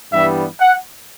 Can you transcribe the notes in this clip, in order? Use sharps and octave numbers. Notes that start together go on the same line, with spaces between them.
G2 E3 G3 B3 E5
F#5